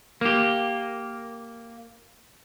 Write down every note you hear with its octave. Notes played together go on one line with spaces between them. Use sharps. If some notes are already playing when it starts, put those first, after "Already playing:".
A#3 G4